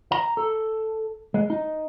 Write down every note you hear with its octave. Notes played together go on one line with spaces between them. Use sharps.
A#5
A4
G#3
D#4